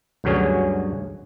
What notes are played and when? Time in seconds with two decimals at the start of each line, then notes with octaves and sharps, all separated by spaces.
0.24 D2 G2 D3 F#3 C#4 G#4